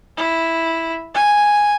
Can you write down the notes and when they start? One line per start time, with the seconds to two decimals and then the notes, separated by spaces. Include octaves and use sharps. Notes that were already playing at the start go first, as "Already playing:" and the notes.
0.17 E4
1.14 G#5